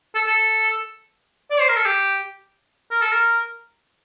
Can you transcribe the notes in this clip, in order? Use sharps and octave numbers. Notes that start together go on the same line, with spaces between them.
A4
A4
D5
C5
A#4
A4
G4
A#4
A4
A#4